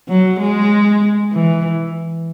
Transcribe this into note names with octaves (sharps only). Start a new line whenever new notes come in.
F#3
G#3
E3